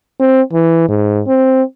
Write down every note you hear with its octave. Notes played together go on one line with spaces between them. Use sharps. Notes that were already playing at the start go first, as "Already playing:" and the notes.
C4
E3
G#2
C4